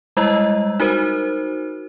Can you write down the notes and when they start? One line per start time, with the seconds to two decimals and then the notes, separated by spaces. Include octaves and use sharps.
0.17 G3 G#3 E4 D#5 A#5 E6
0.80 D#4 F#4 A#4 C5